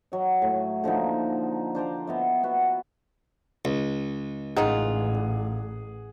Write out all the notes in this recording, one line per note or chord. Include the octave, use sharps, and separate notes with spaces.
F#3 D#5
A2
D3 F3 A#3 D#4
D4 C5 A#5 D6
B3 D#5 E5
B3 F#4 B4
C#2
A1 D#3 D#4 F4 G#4 F#5